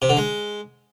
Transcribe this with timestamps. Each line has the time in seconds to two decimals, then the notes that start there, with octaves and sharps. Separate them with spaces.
0.02 C3
0.09 D3
0.17 G#3